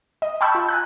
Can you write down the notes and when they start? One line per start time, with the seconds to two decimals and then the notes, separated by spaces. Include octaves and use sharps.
0.22 D#5
0.41 G5 A5 B5 C#6 E6 G6
0.55 F4
0.69 G#5 A#5 F#6